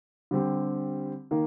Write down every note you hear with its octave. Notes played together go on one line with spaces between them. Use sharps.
D3 G3 C4 G4
D#3 A#3